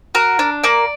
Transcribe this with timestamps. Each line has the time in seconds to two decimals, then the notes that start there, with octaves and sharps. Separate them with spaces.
0.15 F#4 A#4
0.39 D4
0.63 A#3 D5